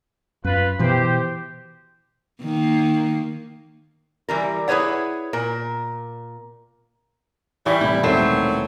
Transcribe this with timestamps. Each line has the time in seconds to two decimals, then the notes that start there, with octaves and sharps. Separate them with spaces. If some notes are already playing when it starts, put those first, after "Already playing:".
0.44 F#2 F4 B4
0.79 B2 E3 G4 C5
2.41 D#3 A#3
4.29 E3 G3 A#4
4.68 E4 G#4 B4 C#5 F#5
5.33 A#2 A#4
7.66 E3 G3 C#6 B6
7.81 C2 A2 E4
8.03 E1 C3 D#3 F#3 A3 C5